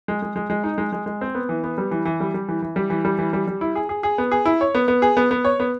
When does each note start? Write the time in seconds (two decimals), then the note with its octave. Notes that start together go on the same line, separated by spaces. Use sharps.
0.08 G#3
0.22 G#3
0.36 G#3
0.50 G#3
0.64 D#4
0.78 G#3
0.92 G#3
1.06 G#3
1.21 C4
1.35 B3
1.49 E3
1.64 B3
1.78 G3
1.91 E3
2.05 E3
2.20 G3
2.34 G3
2.48 E3
2.62 E3
2.76 G3
2.90 E3
3.05 G3
3.18 E3
3.33 G3
3.47 G3
3.61 E4
3.75 G#4
3.89 G#4
4.03 G#4
4.18 B3
4.31 G#4
4.45 E4
4.61 C#5
4.75 B3
4.88 B3
5.02 G#4
5.17 B3
5.31 B3
5.45 C#5
5.60 B3